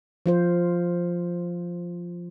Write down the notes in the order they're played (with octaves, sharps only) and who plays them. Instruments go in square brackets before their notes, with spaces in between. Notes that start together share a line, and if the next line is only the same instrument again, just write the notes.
[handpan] F3 F4 C5